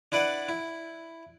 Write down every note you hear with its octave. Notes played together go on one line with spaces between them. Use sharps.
D4 E4 B4 D5 F#5
E4